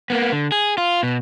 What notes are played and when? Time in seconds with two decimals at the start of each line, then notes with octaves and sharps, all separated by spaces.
0.10 A#3 B3
0.32 D3
0.52 G#4
0.78 F4
1.03 B2